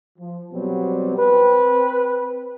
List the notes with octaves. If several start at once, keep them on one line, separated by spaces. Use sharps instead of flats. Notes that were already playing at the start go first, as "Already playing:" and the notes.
F3
B2 F#3 G3 B3 C4
C4 B4